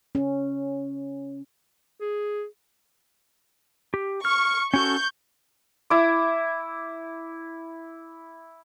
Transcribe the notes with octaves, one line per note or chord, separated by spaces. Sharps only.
C#4
G#4
G4
C#6 F6 C#7
C#4 F#4 A4 C#6 G6
E4 D6